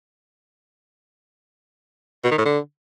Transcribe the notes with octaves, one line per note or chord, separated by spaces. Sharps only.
B2
D#3
A2
D3